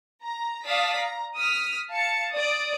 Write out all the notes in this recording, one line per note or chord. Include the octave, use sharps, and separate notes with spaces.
A#5
D5 F5 A5 D#6 B6
A#5
D#6 F6 B6
F5 A5 C#7
D5 D#6